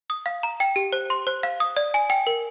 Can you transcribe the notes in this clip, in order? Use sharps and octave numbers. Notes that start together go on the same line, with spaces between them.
D#6
F5
A#5
G5
G4
C5
C6
C5
F5
D#6
D5
G#5
G5
A#4